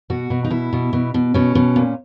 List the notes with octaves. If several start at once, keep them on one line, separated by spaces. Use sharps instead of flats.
B2 F#4
B2
D#4
B2 E4
B2
B2
B2
B2 C#4
B2
A#2